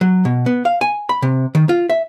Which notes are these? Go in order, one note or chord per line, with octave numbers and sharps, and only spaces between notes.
F#3
B2
B3
F5
G#5
B5
C3
D#3
F4
E5